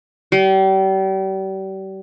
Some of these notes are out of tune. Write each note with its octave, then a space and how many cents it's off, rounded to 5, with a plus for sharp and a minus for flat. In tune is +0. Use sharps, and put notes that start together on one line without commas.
G3 -35